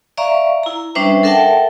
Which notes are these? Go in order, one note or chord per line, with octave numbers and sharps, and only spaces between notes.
D5 E5 F5 A#5 C#6
E4 A#5
G3 C#4 D4 B4 C5 E5
A4 A#4 E5 F#5 G5 A5